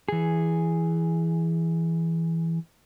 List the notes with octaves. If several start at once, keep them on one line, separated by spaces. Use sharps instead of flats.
E3 G#4